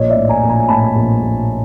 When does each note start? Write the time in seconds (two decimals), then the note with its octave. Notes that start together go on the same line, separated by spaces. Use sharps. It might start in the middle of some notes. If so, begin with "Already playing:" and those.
Already playing: A#1 C#5 D#5
0.10 D5 E5
0.16 A2
0.29 G#5 A#5
0.43 A#1
0.49 G#5 A#5
0.68 A2 A5 B5
0.96 A#1
1.22 A#1